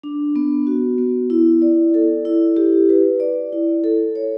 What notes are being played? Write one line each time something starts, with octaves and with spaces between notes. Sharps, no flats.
D4
B3
F#4
B3
E4
D5
A4
E4
G4
B4
D5
E4
A4
C#5